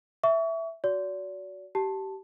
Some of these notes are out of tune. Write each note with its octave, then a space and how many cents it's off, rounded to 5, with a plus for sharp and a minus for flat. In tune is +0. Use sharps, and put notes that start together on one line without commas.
E5 +0 C#6 +35
F#4 +0 D5 -40
G4 -25 A5 +0